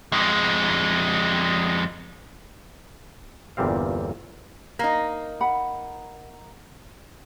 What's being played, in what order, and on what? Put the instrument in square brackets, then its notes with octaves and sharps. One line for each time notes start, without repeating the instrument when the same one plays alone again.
[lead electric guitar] F2 G#3
[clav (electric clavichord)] G1 E2 A#2 G3 C4 F5
[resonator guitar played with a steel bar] A#3 D#4
[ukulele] F#5 B5